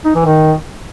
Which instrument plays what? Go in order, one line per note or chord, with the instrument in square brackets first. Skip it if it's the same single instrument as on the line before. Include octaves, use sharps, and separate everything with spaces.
[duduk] D#4
E3
D#3